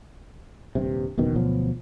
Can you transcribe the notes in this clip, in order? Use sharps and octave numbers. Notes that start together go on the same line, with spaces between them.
D#1 G2 C3
F#1 E2 B2 D#3
D2 B2 F3 F#3